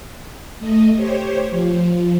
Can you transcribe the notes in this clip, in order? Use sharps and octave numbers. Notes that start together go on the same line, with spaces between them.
A3 D#5
G4 C5 C#5
F3